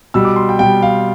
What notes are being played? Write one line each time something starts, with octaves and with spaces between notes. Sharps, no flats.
B2 G3 E6
D6
C6
G5
B2 G3 G5
F5